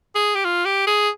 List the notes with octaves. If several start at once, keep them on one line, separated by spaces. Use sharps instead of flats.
G#4
G4
F4
G4
G#4